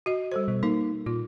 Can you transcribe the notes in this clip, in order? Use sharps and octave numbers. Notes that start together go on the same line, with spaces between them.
F#4 D#5
G3 A4 C5
B2
A#3 D#4
A#2 F4